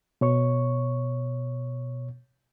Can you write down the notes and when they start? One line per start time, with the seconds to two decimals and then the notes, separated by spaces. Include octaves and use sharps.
0.21 B2 C#5 C#6